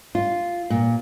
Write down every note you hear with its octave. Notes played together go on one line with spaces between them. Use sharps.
F4
A#2